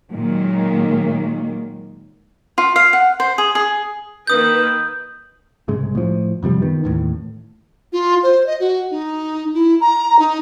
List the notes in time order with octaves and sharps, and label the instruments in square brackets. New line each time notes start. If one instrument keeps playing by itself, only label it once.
[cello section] A#2 D#3 F#3 G#3 A#3
[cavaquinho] F4
F5
F#5
C5
G#4
G#4
[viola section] D#3 A#3 B4 [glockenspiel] D#6 G6
[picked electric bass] C2 G#2 C#3 G#3
A2 F3
F#2 C3 F3 G3
D#3 B3
A1 D#2 A2
[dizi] F4
C5
D#5
F#4
D#4
E4
A#5
D#4